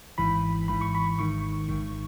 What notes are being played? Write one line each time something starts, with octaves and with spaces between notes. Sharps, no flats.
G#1 G#2 E3 B5
G#1 G#2 E3 B5
C#6
B5
G#1 G#2 D#3 C#6
G#1 G#2 D#3